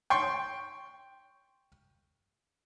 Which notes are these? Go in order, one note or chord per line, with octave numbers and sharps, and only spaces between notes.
G5 C6 C#6